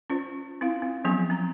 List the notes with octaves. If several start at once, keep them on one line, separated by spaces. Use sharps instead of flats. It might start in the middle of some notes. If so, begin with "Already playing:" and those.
C#4 F4 C5
C4 E4 F5
C4
F3 F#3 B3 C#4 G#4 G#5
C4 A#5